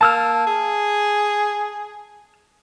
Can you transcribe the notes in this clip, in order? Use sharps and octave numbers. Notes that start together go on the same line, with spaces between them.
A#3 A5 E6 F6
G#4